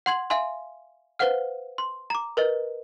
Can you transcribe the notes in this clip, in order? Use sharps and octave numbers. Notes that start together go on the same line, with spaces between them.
F#5 C6 G#6 F#7
E5 F5 G#5 C6
B4 C5 F5 F#5 F6
C6
A#5 D6
A#4 B4 D#5